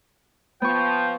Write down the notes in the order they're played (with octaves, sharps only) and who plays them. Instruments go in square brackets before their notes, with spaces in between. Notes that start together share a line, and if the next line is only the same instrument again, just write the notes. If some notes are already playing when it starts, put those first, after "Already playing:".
[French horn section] F3 [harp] B3 C#6 [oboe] G5